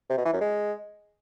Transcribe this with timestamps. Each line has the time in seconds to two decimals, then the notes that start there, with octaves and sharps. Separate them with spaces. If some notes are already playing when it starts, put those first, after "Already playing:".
0.10 C3
0.17 B2
0.25 E3
0.33 F#2
0.41 G#3